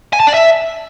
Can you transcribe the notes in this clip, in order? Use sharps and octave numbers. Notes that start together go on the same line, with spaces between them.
G#5
A5
D5
E5